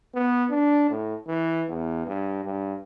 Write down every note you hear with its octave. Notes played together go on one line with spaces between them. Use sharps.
B3
D4
A2
E3
E2
G2
G2